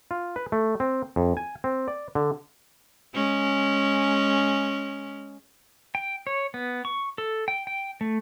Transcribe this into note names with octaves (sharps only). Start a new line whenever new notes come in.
F4
B4
A3
C4
F2
G#5
C4
D5
D3
G#3 C#4
G5
C#5
B3
C#6
A4
G5
G5
A3